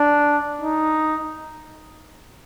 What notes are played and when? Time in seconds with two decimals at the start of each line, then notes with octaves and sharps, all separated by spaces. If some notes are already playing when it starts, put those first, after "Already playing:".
Already playing: D4
0.61 D#4